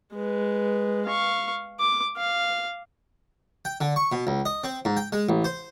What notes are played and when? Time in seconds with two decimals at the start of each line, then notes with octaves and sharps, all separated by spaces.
0.13 G#3 B4
1.06 F5 C#6
1.80 D6
2.17 F5
3.65 G5
3.81 D3
3.96 C#6
4.12 B2
4.27 C#2
4.46 D#5
4.64 C4
4.85 G#2
4.97 G5
5.12 G#3
5.29 A1
5.44 C5